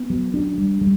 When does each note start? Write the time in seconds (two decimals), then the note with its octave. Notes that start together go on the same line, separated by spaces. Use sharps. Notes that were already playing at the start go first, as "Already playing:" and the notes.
Already playing: B3
0.10 F#3
0.34 D4
0.58 G3
0.81 G3